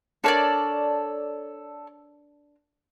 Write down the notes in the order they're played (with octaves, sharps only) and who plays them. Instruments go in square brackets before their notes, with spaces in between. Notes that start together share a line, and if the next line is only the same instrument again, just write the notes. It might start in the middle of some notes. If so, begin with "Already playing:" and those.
[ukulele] D4 A#4 A5 [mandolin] A4 C#5 D5